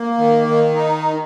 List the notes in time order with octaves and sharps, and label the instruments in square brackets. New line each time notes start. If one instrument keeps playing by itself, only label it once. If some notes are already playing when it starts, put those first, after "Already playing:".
Already playing: [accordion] A#3
D#3
D#3
D#4